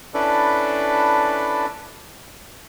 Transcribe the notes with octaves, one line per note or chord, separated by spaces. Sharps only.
C#4 D4 E4 A4 B4 D5